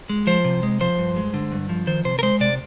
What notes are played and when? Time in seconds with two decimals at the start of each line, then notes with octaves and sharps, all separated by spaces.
0.09 G#3
0.27 F3 C5
0.45 C3
0.63 G#3
0.80 F3 C5
0.98 G2
1.17 G#3
1.34 D3
1.52 G2
1.69 F3
1.87 D#3 C5
2.05 C3 C5
2.19 A#4
2.23 G#3 C5
2.40 C3 D5